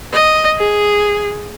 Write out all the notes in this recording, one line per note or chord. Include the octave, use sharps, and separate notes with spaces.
D#5
G#4